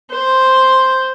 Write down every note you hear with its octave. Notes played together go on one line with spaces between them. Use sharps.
C5